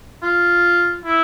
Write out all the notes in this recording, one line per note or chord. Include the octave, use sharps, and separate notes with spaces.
F4
E4